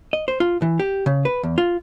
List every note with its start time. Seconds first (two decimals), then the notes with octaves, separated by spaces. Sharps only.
0.13 D#5
0.28 C5
0.40 F4
0.62 E3
0.79 G4
1.06 C#3
1.25 B4
1.43 E2
1.58 F4